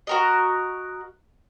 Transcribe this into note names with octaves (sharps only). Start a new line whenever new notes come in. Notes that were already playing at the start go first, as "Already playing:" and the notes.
F#4 A#4 D#5